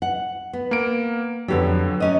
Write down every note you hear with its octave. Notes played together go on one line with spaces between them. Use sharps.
F#5
B3
A#3 D7
F2 D3 F#3 B3 G4
F#3 C#4 D#5